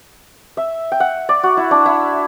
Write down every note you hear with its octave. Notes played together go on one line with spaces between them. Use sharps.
E5
G5
F#5
D5
F#4
E4
D4
E4